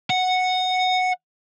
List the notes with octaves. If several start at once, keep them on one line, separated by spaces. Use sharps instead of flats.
F#5